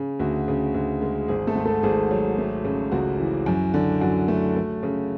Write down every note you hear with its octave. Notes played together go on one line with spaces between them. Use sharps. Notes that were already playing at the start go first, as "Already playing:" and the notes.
Already playing: C#3
D2 F#4
C#3
D2
G#3
G#1 G#4
A3 A4
G#2
A3 A4
G#1 G#4
F#3
A3
C#3
C#2 F#4
E3
F#2
D3
F#2 F#4
A3
A3
C#3